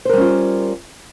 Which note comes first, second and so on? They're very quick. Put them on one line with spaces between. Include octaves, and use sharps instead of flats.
C5 A#4 G3 C#4 F4